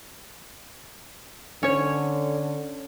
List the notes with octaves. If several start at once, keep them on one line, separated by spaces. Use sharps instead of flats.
D3 C#4 C#5